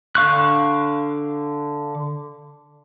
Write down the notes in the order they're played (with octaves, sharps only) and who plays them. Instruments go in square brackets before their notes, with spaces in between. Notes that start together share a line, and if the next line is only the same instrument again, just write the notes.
[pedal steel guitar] D3 F5 C#6 F#6